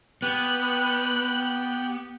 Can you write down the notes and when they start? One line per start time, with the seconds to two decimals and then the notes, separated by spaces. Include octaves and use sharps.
0.22 B3 G4 G5 F#6